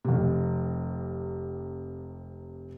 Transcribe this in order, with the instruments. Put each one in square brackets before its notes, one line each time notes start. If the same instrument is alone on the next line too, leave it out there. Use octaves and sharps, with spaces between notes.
[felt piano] F1 C3